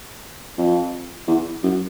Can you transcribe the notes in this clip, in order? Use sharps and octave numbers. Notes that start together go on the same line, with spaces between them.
F2
E2
F#2